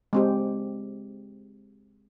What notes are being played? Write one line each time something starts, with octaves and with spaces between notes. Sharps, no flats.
G#3 C4 G4